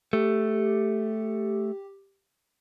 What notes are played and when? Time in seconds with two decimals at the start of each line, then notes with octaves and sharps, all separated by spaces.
0.13 A3 G4